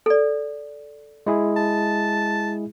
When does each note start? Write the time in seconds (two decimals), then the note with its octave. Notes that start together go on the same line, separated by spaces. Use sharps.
0.06 A4 D5
1.27 G#3 E4 G#4
1.56 A5